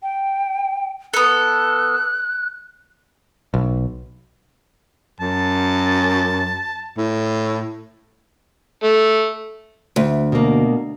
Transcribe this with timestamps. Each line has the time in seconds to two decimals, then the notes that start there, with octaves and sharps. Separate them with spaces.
0.03 G5
1.14 B3 A4 F#6
3.54 B1
5.20 F#2 A5
6.97 A2
8.84 A3
9.96 D2
10.32 B2 A#3